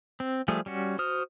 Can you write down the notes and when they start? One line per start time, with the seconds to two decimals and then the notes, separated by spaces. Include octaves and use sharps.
0.20 C4
0.48 F3 G3 A3 G#4
0.66 G3 C#4 F#4
0.99 F#4 C5 D#6 F6